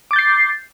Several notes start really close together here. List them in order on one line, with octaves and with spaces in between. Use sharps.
D6 A6 G6 C7